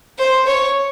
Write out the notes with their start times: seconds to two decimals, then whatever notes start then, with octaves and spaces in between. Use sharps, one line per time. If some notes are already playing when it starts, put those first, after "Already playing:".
0.18 C5
0.47 C#5